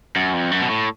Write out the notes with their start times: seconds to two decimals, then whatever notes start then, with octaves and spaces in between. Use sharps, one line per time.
0.16 F#2
0.33 F2
0.52 F#2
0.62 B2
0.69 A2